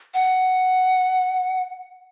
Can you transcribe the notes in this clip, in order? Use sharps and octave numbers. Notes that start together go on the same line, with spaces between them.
F#5